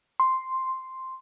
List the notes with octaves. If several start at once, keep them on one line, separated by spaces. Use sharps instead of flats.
C6